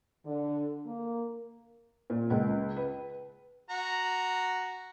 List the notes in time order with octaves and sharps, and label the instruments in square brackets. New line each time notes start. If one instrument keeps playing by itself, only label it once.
[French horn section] D3
A#3
[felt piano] A#2
C#2
B4
[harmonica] F#4 A#5